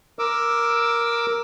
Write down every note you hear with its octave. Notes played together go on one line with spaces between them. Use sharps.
A#4 D6 E6